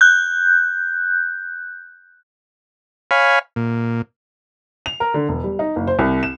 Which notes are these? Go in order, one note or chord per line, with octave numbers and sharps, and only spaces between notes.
F#6 G6
C#5 F5 G#5 B5
A#2
F7
A#4
D3
E1
G3
D#4
F#1
C5
C2
E7